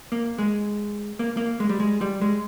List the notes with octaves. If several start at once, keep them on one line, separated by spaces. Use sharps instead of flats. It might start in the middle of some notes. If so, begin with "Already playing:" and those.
A#3
G#3
A#3
A#3
G#3
G3
G#3
G3
G#3